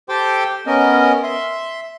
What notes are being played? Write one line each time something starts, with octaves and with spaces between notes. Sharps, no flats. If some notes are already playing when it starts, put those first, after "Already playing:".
G4 A4 C5 G5 C6 D6
B3 C#4 A#4 D#5
E5 C6